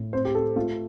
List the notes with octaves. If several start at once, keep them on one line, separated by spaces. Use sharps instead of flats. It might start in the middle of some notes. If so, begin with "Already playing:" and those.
Already playing: A2
C4 C5
G4
C4 A4
A3 F4